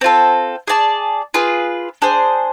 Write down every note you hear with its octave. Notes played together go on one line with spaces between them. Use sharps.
C4 F4 A4
G#4 D5 A5
F4 G#4 B4
D4 G#4 C5